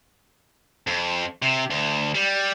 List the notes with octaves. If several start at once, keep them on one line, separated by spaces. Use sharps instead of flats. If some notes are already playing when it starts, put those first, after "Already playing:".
F2
C3
D2
G3